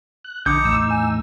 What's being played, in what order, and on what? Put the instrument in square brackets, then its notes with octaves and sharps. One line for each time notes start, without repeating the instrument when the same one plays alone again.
[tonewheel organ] F#6
[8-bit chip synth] A#1 D#6 C#7 [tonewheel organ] D3 [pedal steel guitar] D#4 D6 G6
[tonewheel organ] E2 A2 E6
[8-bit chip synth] G#5